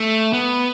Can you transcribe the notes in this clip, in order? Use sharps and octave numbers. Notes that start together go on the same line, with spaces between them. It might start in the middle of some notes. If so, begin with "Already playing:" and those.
Already playing: A3
B3